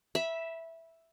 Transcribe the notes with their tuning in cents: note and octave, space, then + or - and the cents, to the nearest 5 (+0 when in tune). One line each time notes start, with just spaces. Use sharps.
E5 +0 B5 -15